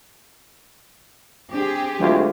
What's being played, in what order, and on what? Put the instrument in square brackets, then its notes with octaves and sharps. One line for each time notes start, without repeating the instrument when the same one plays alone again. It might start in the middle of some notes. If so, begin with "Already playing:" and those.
[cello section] C4 G4 G#4 [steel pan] D4
[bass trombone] D2 [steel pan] F#3 E4 F4 [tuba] G#3